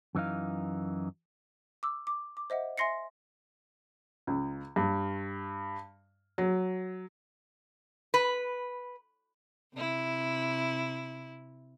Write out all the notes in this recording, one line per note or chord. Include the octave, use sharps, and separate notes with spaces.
F#2 E3 D#4 F5
D6 E6
D6
D6
C5 D#5 E5 F#5
E5 G#5 C6 A#6 C7 C#7
C#2
G2
F#3
B4
C3 E4